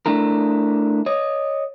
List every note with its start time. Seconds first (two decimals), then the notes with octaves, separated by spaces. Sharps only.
0.06 A3 D4 E4 A#4
1.06 C#5 D#5